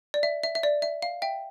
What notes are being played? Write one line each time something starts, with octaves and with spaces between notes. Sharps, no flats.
D5
E5
E5
E5
D5
E5
F5
E5 G5